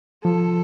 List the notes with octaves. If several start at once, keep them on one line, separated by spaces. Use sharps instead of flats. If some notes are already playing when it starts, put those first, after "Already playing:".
F3 A4